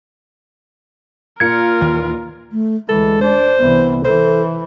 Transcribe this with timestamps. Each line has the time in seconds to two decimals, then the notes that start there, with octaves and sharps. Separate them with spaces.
1.40 A#2 A#3 F4 A#4 G#6 C#7
1.81 D#2 D#3 E3
2.52 A3
2.89 D2 E3 G#3 A4
3.21 D4 C5
3.59 C2 E3 B3
4.05 E3 A4 C5